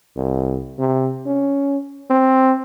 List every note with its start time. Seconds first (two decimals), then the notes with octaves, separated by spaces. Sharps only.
0.16 C2
0.79 C3
1.26 C#4
2.10 C4